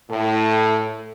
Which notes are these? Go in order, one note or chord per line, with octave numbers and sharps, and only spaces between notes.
A2 A4